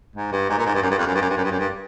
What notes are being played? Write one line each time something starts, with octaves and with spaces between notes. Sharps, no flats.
G#2
G2
G#2
A#2
G#2
G2
F#2
G2
F2
F#2
G2
F#2
G2
F#2
G2
F#2
G2